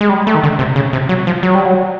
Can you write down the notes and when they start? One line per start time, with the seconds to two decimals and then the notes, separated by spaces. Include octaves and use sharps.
0.01 G#3
0.09 G3
0.27 A3
0.35 D#3
0.43 D3
0.59 C3
0.76 C#3
0.93 C3
1.09 F#3
1.27 F3
1.43 F#3
1.55 G3
1.66 F#3